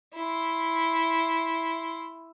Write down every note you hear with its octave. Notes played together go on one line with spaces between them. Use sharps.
E4 C6